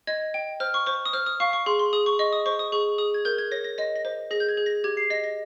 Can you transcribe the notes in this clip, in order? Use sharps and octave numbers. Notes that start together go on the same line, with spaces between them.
D#5 G#6
G5
C5 F6
C#6
C5 C#6
D#6
C5 F6
D#6
F5 C#6
C#6
G#4 C6
C6
G#4 D#6
C#6
D#5 C#6
D#6
C5 C#6
D#6
G#4 C#6
G#4 D#6
G#6
A#4 G6
G#6
C#5 A#6
A#6
D#5 A#6
A#6
C5
G#4 A#6
G6
G#6
G#4
A#6
G4 G#6
C7
D#5 A#6
A#6